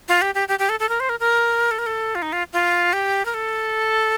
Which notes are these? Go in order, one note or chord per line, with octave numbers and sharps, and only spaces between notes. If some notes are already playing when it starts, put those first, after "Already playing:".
F4
G4
G4
G4
G4
A4
A4
A#4
C5
A#4
A#4
A4
A#4
A4
F4
D#4
F4
F4
G4
A#4
A4